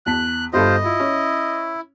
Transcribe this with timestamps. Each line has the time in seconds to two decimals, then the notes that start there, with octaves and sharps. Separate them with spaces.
0.06 E2 A5 F#6 B6
0.54 G1 G2 F4 A4 C5 D#5
0.84 E4 F4
1.00 C#4